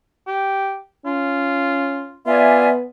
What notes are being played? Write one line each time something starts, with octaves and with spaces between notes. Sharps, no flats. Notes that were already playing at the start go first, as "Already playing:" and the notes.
G4
C#4 F4
B3 F4 D5 E5 G#5